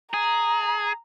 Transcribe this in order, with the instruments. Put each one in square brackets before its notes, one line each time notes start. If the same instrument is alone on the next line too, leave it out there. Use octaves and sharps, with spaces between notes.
[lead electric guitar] G#4 [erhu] A#5